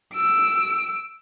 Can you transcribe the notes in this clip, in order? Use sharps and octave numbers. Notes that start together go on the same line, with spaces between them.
E6 D7